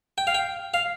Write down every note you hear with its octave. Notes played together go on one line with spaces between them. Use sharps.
G5
F5
G5
F5